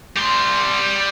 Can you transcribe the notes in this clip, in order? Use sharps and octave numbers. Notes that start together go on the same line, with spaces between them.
G3 C6